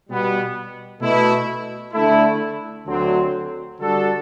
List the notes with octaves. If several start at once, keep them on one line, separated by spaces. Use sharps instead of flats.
B2 G3 B3
B2 A3 E4
D3 A3 E4
D2 D3 F#3 C4
D3 G3 D4 F#4 A4